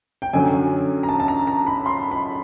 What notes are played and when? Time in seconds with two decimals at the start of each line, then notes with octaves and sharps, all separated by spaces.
0.22 G5
0.33 F#2 D3 F#3 G#5
1.03 A#5
1.09 A5
1.20 A5
1.28 A#5
1.47 A#5
1.67 B5
1.86 C6
2.11 B5